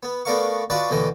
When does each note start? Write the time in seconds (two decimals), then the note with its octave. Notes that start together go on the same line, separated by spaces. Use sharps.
0.03 B3
0.25 A3 B3 D4 A#4 F5 C#6
0.70 D4 F4 F#4 B4 D5 D#5
0.90 D#2 B2 D3 E3 D#5